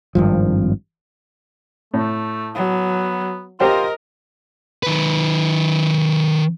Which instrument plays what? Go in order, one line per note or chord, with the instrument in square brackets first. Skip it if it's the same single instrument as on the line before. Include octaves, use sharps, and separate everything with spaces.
[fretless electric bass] G#1 G2 F3
[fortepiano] A2 [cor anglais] A3
[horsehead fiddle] F#3 [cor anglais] B3
[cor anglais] F4 [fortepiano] G4 C5 G5 [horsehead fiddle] A#4 D#5
[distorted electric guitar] D#3 B4